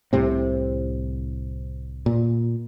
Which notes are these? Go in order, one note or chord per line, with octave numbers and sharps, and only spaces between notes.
C2 A2 C3 C4
A#2